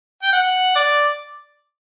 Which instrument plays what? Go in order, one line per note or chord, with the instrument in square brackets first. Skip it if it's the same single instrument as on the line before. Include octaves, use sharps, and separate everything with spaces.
[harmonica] G5
F#5
D5